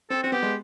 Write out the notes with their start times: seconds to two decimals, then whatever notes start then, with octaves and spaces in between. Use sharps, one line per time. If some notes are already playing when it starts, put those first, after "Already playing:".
0.10 C4 A4
0.23 C4 F#4
0.32 B3 G4
0.42 G#3